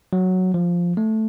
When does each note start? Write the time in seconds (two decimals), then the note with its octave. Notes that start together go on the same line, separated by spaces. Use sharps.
0.13 F#3
0.54 F3
0.97 A3